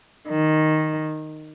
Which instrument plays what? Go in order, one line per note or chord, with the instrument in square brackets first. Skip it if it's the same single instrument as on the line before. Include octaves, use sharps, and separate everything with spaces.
[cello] D#3